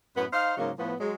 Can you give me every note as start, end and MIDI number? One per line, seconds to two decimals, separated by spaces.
0.15 0.26 42
0.15 0.26 45
0.15 0.26 59
0.32 0.54 63
0.32 0.54 72
0.32 0.54 77
0.57 0.72 44
0.57 0.72 49
0.57 0.72 54
0.57 0.72 58
0.77 0.94 45
0.77 0.94 53
0.77 0.94 59
1.00 1.15 54
1.00 1.15 56